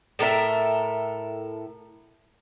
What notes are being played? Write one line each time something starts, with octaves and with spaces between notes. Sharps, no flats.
A2 A4 A#4 E5